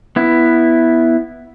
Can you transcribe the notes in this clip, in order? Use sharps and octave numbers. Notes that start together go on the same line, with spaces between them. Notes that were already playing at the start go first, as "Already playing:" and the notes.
B3 E4